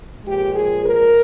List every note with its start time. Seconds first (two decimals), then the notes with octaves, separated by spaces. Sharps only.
0.24 A#2 F3 G#3 G4
0.54 G#4
0.83 A#4